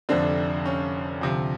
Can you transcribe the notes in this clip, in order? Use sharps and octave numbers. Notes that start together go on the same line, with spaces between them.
F1 F2 D3 C4 D4
C#4
D2 C3 F3